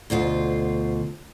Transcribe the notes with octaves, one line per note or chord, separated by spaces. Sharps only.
D2 B2 F4 C5